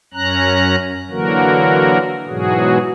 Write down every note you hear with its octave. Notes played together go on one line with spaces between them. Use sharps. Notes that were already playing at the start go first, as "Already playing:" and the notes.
F#2 C#4 A#5 F#6
D3 E3 F#3 A#3 F#4 A#4
G#2 B2 E3 F#3 F#4 G#4